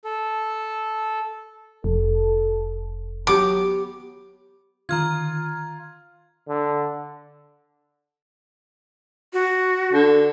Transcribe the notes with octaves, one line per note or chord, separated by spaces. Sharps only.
A4
F1 A4
F#3 B3 G4 D6
D3 D#3 F4 A#5 F6 G#6
D3
F#4
D3